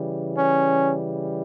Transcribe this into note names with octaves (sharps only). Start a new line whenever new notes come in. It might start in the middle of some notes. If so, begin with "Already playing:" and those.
Already playing: C#3 E3 G3
C#4